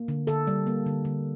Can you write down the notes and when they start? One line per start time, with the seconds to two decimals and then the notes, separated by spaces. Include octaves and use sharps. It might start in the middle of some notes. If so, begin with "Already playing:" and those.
Already playing: A#3
0.08 D3
0.27 D3 A4
0.47 G3
0.67 A#3
0.86 D3
1.05 D3